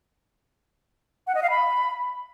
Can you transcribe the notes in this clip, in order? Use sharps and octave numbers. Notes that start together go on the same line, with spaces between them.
F#5
D#5
F5
B5